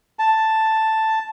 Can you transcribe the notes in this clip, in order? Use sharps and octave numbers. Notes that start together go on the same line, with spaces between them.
A5